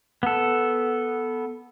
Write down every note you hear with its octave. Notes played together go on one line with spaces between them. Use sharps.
B3 A4